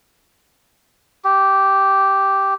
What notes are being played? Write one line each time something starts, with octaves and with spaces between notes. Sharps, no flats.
G4